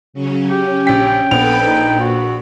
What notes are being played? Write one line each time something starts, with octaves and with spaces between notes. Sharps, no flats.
C#3 F#3 C#4
C#4 G4
A#1 G5 B6
A#1 B3 A4 B4 B5 F7
A#2 D#4
F#4